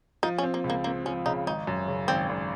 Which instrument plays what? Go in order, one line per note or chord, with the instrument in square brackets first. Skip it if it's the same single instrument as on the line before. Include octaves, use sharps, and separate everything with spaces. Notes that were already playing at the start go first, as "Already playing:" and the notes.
[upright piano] F3 [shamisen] D#4
[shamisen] C#4
[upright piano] C4
[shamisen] A#3
[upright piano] C#2
[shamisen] A#3
[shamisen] A#3 [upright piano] C4
[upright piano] F3 [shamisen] C#4
[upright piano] C#3 [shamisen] D#4
[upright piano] G#1 [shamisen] D#4
[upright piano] F#2
C#3
[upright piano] G#1 [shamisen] C4
[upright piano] G#1